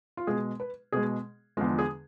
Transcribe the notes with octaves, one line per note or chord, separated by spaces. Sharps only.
F4
B2 G#3 G#4
B4
B2 G#3 G#4
E2 D3 F3 G#3 F4
G#4